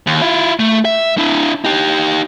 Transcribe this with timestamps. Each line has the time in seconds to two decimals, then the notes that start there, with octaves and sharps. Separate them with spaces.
0.07 D#2
0.22 E4 F4
0.59 A3
0.85 E5
1.18 D4 E4
1.65 D#4 G4